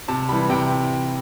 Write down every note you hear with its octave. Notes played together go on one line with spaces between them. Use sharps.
C3 A5
E3 G3 B5
C3 G5